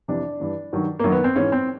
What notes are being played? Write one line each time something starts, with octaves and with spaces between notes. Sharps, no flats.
F2 C3 E3 D4
G2 E3
G2 D#3 F#3
F#2 D#3 F#3 A#3
B3
C4
G#2 E3 C#4
C4